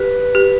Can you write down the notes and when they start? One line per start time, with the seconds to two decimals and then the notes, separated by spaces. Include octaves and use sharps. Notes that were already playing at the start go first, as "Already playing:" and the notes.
Already playing: G4 B4
0.35 G4